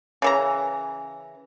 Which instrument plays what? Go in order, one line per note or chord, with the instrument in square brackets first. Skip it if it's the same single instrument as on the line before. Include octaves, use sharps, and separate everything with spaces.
[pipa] C#3 E3 A#5